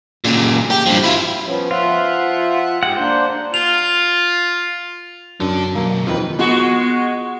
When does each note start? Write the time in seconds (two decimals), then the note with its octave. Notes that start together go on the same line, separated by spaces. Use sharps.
0.24 A#2 C#3
0.71 G4
0.86 G2 F3
1.04 E4 F4
1.45 F3 B3 C#4
1.71 F3 F4 E5 F#5
2.83 G#2 G4 G#4 F#5
2.97 A#3 D4 C5
3.54 F4 F7
5.40 F#2 D4 A4
5.75 B1 F#2 A#3
6.07 F2 D#3 B4
6.39 G#3 B3 F4 F#4